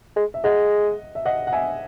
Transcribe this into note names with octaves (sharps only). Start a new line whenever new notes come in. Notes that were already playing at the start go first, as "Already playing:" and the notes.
G#3
E5
G#3 D#5 F#5
E5
D#5 F#5
F#5
E5 G#5